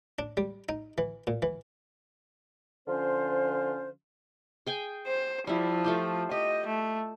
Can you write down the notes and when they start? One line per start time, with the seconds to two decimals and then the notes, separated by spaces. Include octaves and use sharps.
0.19 D4
0.37 G3
0.69 D#4
0.98 E3
1.27 A#2
1.42 E3
2.88 D3 F3 C#4 F4 C5
4.66 G#4 G5 G#5
5.06 C5
5.47 F3 G3 E4
5.84 A3 F4 G4
6.31 G4 D#5
6.66 A3